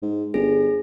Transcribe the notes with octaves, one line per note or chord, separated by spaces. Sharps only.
G#2
G1 G#4